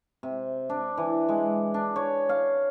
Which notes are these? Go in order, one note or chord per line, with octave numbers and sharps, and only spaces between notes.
C3
D4
E3
G#3
D4
C#5
F5